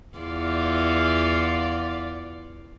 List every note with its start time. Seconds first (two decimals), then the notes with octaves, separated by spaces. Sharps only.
0.18 E2 F4 D5